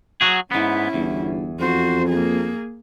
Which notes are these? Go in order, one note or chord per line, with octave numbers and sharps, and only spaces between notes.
F#3 F#4 G#4
G#2 B3 C#4 E4
G1 E2
F2 F#4 C5
A#3 G#4